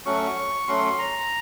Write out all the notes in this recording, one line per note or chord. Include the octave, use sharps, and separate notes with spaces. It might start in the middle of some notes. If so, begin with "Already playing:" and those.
F#3 A3 C#4 F#4 C#6
F#3 A3 C#4 F#4 C6
A#5